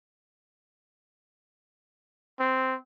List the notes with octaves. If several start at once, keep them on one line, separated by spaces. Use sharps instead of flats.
C4